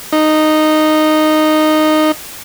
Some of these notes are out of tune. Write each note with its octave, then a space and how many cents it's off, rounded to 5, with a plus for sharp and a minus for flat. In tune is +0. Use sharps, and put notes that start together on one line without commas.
D#4 -10